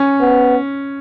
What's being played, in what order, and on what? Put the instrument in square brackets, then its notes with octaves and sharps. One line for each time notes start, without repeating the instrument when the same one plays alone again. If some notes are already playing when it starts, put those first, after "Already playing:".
Already playing: [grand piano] C#4
[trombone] B3